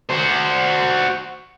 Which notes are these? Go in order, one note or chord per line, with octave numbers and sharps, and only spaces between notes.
F#4 C5